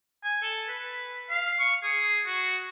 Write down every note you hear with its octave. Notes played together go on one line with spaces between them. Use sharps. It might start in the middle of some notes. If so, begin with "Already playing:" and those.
G#5
A4
B4
F5
C#6
G#4
F#4